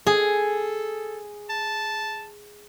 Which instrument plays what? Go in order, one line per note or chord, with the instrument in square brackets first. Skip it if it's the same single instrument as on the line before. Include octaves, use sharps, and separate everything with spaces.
[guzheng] G#4 [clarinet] A4
[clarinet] A5